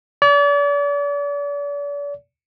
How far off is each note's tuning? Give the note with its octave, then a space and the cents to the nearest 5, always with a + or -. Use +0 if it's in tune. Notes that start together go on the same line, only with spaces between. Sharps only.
D5 -40